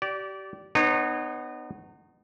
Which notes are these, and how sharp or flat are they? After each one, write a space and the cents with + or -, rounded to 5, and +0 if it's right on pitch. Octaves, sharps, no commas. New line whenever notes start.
G4 -30 D5 -15
B3 +15 D#4 -35 C#5 -20